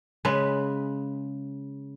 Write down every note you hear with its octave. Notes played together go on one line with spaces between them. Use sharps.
C#3 G#3 B4